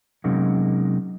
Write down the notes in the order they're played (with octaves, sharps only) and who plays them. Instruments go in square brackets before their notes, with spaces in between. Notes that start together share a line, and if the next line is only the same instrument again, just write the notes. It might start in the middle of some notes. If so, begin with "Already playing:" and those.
[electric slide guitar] C3 F#3 G#3 A#3 C#4 D#4